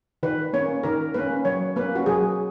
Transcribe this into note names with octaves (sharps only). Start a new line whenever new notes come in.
D#3 B4
A#3 C#4 C#5
D#3 A#4
A#3 C#4 B4
F#3 C#5
A#3 C#4 B4
F#4
F#3 G#4